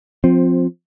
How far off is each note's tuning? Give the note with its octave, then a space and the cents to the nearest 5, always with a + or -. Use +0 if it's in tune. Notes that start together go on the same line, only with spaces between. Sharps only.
F3 +15 C4 +0